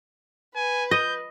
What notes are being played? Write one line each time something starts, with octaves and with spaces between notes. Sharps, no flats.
B4 G#5
D#5 G6